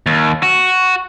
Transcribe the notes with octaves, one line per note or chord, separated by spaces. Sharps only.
D#2
F#4